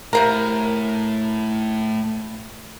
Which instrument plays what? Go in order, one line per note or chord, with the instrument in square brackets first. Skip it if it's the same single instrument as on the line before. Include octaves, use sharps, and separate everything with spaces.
[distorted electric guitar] A2 [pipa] C3 A#3 A#4